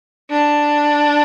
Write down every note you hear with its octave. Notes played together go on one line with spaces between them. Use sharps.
D4